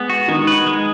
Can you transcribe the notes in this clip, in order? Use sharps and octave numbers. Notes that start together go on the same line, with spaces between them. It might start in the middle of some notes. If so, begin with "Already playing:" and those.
Already playing: G#3 B3
F#4
D#3 G#3 D#4
B4
G#3